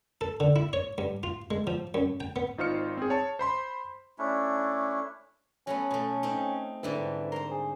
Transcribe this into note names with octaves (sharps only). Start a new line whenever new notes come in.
A4
D3
E4
C#5
G2
F4
G#3
F3
F#2
G5
B3
G#1 D#4 F4 C5 F6 C#7
C4 G#4
C#5 A5
C5 B5 C6
A3 C#4 D4 E4
F#3 A3 B3 C#4
B2 A3
C4 D#4
G#2 D3 E3 G3
A#4 C5 C6
G#4